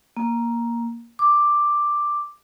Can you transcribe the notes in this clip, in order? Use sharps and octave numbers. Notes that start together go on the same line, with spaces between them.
A#3
D6